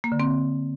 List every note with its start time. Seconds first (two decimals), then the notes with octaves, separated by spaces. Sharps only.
0.04 A#3
0.12 D3
0.20 C4